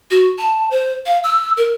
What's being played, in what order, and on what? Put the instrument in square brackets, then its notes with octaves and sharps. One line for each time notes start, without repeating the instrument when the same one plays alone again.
[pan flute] F#4
A5
C5
F5
E6
A#4